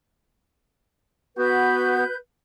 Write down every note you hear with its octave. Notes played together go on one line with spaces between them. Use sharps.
B3 F#4 B4 G6